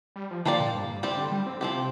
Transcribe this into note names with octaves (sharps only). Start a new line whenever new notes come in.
G3
F3
D3 F3 A#3 G4 D5
A#2
G2
G2
C3 G3 C4 G4
D3
G3
C4
D3
C3 F3 C4 G4